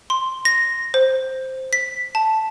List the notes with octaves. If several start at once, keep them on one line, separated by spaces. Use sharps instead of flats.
C6
A#6
C5
B6
A5